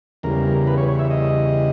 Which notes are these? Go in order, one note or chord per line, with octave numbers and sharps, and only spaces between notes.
E2 C#3 G3 A#4
B4
C#5
C#5
E5
D#5